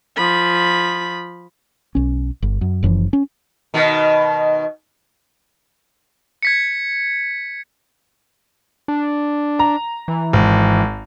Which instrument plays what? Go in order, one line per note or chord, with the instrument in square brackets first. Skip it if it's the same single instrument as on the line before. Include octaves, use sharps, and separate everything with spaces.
[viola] F3 B5
[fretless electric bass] B1 C#4
G1
F#2
F#1 F#2 E3 F3
C#4
[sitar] B2 D#3
[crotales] G#6 B6 C#7
[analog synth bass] D4
[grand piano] A#5
[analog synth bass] E3
[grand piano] G#1